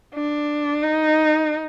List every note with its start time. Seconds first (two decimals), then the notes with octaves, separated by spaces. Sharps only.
0.14 D4
0.83 D#4